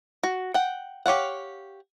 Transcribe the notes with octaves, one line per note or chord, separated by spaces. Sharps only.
F#4
F#5 G5
G4 C#5 F5 F#5